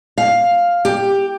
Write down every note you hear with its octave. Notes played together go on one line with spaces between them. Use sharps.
F5
G4